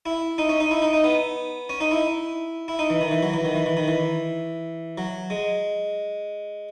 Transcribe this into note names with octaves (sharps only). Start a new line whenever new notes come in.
E4
D#4
C#4
D#4
E4
D#4
D#4
B3
C#4
D#4
E4
E4
D#4
E3
D#3
E3
F#3
E3
D#3
E3
E3
D#3
E3
F#3
G#3